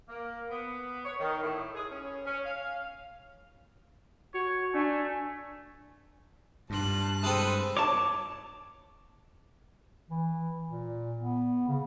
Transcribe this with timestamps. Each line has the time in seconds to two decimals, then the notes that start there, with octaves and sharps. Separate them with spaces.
0.09 A#3
0.50 B3
1.05 C#5
1.20 D#3
1.42 A2
1.75 G#4
1.91 C#4
2.26 C#4
2.45 F5
4.34 F#4 C#5
4.74 A3 D4 G#5
6.70 G2 F4 A5 F#6
7.23 G#3 C4 A4 B4 D#6
7.77 C#5 A5 D6
10.10 E3
10.68 A#2
11.18 B3
11.68 C#3